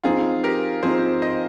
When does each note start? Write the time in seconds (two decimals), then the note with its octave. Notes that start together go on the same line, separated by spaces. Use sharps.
0.04 F3 C4 D#4 F4 G#4
0.44 G4 A#4
0.83 F3 C4 D#4 G#4 C5
1.22 C5 D#5